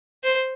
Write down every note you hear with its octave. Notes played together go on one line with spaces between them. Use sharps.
C5